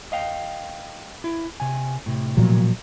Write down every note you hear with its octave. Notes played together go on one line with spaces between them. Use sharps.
D#5 F5 G5
E4
C3 G#5
A2 C3
A#2 F3 F#3